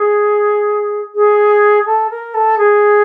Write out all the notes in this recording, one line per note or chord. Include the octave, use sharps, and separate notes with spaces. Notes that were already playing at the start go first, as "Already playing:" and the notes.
Already playing: G#4
G#4
A4
A#4
A4
G#4